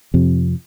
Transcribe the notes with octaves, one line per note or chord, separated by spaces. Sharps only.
F2 C3